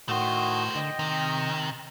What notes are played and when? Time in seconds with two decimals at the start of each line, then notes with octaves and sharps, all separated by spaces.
0.09 A2 D#3 A3 F#4 C5 D#6
0.75 D3 D#5 G5
0.99 C3 D#3